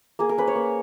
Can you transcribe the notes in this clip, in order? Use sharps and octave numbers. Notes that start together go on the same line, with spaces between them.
A#3 G#4
A#4
C#4 B4
C#5
A#3